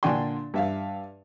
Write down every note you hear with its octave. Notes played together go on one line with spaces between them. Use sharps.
A#2 D3 D4 G5 G#5 C6
G2 E5 F5